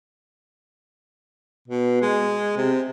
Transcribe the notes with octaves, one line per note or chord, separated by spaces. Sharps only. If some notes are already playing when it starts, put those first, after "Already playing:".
B2
G#3
C3